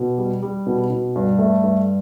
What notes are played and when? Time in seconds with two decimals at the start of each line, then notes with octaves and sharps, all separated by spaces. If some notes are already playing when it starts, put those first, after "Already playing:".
Already playing: B2
0.18 G3
0.42 G3
0.66 B2
0.90 B2
1.16 G2
1.39 A3
1.64 G2